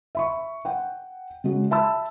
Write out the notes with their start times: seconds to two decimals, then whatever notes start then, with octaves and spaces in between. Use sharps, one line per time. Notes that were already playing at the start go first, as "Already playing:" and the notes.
0.15 E5 B5 C#6
0.65 F#5 G5
1.44 C#3 G#3 F#4
1.71 E5 A5 B5 E6